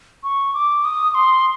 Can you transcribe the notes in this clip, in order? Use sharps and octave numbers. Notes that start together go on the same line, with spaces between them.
C#6
D6
D#6
C6